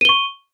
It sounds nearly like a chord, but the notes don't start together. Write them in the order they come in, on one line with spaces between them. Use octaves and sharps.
D#7 G7 C#6